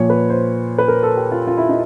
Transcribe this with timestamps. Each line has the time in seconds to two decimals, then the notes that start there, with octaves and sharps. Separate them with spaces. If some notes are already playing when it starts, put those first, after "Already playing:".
Already playing: A#2 F3 C#5
0.10 B4
0.30 C5
0.78 B4
0.88 A#4
1.03 A4
1.17 G4
1.32 F4
1.47 F4
1.58 E4
1.69 D#4